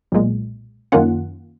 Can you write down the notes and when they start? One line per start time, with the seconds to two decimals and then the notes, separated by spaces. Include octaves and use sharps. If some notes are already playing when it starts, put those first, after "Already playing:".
0.12 B1 A#2 G#3
0.92 F#2 D#3 A#3 C#4 F4 F#5